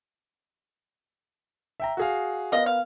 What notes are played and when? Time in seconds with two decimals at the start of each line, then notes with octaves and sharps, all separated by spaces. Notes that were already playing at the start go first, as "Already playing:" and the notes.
1.80 E5 G5 A#5
1.97 F#4 G#4 F5
2.52 B3 F4 A#4 D#5
2.66 F5